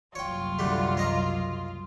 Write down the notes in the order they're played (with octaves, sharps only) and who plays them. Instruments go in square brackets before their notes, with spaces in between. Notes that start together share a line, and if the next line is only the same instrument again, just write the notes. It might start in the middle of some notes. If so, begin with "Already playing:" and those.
[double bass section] F#1 C2 F#3 [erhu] F4 [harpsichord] C#5 G5
[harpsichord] D3 G3 A3
A#3 D#5 A#5